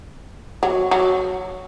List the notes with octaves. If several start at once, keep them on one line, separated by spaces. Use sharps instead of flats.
F#3
F#3